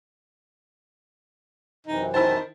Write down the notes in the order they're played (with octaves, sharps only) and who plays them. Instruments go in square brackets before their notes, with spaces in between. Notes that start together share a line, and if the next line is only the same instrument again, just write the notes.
[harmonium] F#2 C3 E3 [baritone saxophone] D#4
[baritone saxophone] D#3 [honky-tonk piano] E4 C5 [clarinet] A5